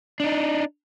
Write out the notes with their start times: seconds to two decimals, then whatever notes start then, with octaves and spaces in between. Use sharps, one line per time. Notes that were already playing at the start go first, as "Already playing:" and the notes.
0.20 D4 D#4